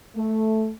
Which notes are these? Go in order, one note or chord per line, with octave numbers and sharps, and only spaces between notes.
A3